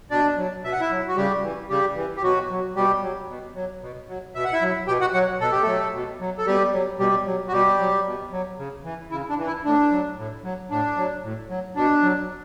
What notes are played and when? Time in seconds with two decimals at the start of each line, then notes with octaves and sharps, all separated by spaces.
0.11 B2 D4 D5
0.37 F#3
0.64 B2 E5
0.72 F#5
0.80 E4 E5
0.91 F#3
1.08 F#4
1.16 C#3 G3 G4
1.43 E3
1.70 C#3 G3 G4
1.96 E3
2.17 G4
2.22 B2 F#3 F#4
2.50 F#3
2.76 B2 G3 G4
3.02 F#3
3.29 B2
3.55 F#3
3.82 B2
4.08 F#3
4.35 B2 E5
4.45 F#5
4.53 E4 E5
4.61 F#3
4.88 B2 G4 G5
5.01 F#4 F#5
5.14 F#3 F#4 F#5
5.41 B2 A4
5.52 G4
5.62 F#3 A3 A4
5.94 B2
6.20 F#3
6.38 A4
6.47 B2 G3 G4
6.73 F#3
6.99 B2 G3 G4
7.26 F#3
7.48 F#4
7.52 B2 G3 G4
7.79 F#3
8.05 B2
8.32 F#3
8.58 C#3
8.84 E3
9.11 C#3 E4
9.29 D4
9.38 E3
9.47 E4
9.65 A2 D4
9.91 F#3
10.17 A2
10.44 F#3
10.70 A2 D4
10.97 F#3
11.23 A2
11.50 F#3
11.76 B2 D4
12.03 F#3